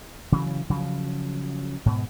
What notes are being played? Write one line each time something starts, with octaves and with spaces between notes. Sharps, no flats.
C#3 E3 F#3
C#3 F3 F#3
G#2 B2